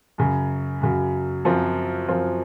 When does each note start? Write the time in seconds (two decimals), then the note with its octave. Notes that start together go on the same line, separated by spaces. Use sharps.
0.18 F#2 C#3 F#3
0.81 F#2 C#3 F#3
1.45 F#2 F3 C4 F4
2.09 F#2 F3 C4 F4